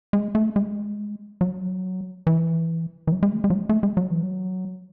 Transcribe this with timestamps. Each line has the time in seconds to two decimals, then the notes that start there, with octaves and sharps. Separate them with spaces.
0.13 G#3
0.35 A3
0.56 G#3
1.41 F#3
2.27 E3
3.07 E3
3.12 F#3
3.23 G#3
3.33 A3
3.44 G#3
3.50 F#3
3.55 G#3
3.69 A3
3.83 G#3
3.97 F#3
4.11 E3
4.23 F#3